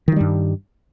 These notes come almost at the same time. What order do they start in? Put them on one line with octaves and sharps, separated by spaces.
D#3 F3 G3 G2